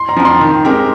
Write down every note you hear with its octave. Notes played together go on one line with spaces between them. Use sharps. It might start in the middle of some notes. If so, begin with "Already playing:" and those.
Already playing: C6
A#5
F3 C4
C6
D#3
G#3 C4 G4 A#4